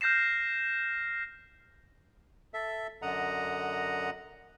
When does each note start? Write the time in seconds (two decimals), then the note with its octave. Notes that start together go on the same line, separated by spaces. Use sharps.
0.01 F6 G6 A#6 C7 E7
2.54 A4 E5
3.02 F#2 D3 D#5 F#5 A#5